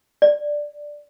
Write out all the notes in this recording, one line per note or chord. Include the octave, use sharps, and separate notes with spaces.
D5